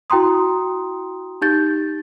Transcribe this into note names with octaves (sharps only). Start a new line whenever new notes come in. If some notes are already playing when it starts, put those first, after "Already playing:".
E4 F#4 G5 A#5 C6 D#6
D#4 G4 G6 A6